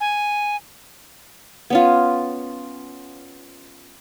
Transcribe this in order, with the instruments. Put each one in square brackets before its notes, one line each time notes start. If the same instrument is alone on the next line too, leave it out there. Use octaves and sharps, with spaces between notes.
[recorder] G#5
[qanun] B3 C#4 F4